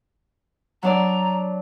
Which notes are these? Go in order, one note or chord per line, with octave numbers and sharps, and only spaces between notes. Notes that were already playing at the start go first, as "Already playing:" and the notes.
F#3 D4 D5 A#5